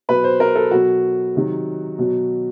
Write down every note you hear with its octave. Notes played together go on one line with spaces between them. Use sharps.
B2 F#3 B4
C5
A#4
A4
B2 F#3 F#4
C3 D#3 F#3
B2 F#3